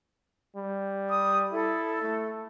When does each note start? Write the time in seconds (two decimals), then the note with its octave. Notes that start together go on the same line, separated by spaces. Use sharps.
0.56 G3
1.10 D#6
1.53 E4 A4
2.02 A3